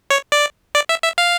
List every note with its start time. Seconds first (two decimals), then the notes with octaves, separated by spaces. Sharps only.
0.10 C#5
0.32 D5
0.75 D5
0.89 E5
1.04 E5
1.18 F5